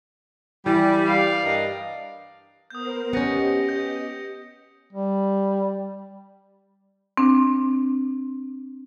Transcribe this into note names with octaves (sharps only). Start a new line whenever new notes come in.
E3 G3
D5 F5
G2 A#4 D#5
B3 A#4 C5 D#6 G6
B3 C#4 G4 D#5 G6 A#6 C#7
G6
G3
C4 D4